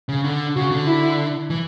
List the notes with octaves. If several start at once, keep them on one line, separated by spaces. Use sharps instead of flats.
C#3
D3
C#3 F#4
D3
E4
E3